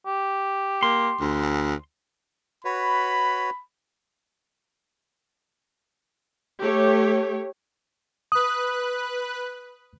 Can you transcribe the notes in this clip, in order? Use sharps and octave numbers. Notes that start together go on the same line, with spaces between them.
G4
A#3 C6
D2
F#4 B4 C#5 B5
A3 G4 C#5
B4 D#6 F#6